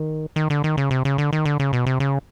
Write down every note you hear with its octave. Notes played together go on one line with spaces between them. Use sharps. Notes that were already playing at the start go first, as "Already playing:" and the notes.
Already playing: D#3
D#3
D3
D#3
C#3
C3
C#3
D3
D#3
D3
C#3
B2
C3
C#3